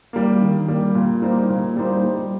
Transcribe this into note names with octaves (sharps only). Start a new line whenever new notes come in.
G3 A#3
D#3
G3 A#3
A#2
G3 A#3 D#4 C5
A#2
G3 A#3 D#4 C5
G3